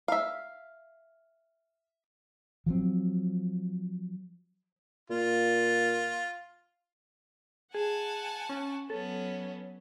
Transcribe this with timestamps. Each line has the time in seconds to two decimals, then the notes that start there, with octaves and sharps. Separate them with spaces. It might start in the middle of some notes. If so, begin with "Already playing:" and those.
0.08 E5 F5
2.66 F3 F#3 C4
5.10 A#2 F4
7.75 G#4 F#5 G#5 A5
8.49 C#4
8.90 F#3 B3 C#4 A4